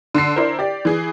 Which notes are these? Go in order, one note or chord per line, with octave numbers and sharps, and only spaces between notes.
D3 C7
D4 E4 A#4 C5
G4 D5
E3 G#4